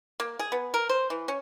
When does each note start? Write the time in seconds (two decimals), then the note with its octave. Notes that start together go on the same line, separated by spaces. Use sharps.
0.20 A#3
0.39 G#4
0.52 B3
0.74 A#4
0.89 C5
1.10 E3
1.28 C#4